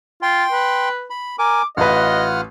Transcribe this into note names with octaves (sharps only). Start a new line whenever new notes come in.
F4 G5 C6
B4
B5
A#4 G#5 D6
A1 F4 B4 D#5 F#5 F6